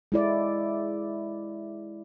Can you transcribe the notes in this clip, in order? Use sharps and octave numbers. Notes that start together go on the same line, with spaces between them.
G#3 E4 D5